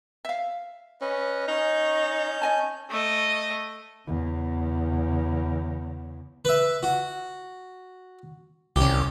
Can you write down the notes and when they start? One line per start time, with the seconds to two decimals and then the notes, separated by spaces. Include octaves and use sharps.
0.25 E5 F5
1.01 C#4 B4 D#5
1.48 C#4 D#4 G6
2.42 D#5 G#5 A5
2.90 A3 D#5
4.07 E2 C#3
6.45 B4 E5
6.83 F#4
8.76 C2 C#4 G4